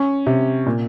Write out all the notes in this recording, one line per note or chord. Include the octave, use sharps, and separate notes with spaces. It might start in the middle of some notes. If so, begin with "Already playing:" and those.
Already playing: C#4
C3
A#2